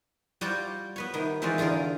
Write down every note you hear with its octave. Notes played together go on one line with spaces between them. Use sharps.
G3 F4 F#4 C5 D5 G5
B3 B4 C#5
C3 D#3 B3
E3 G#3 C4 F4 F#4 D5
E2 D3 F4 G#4 A#4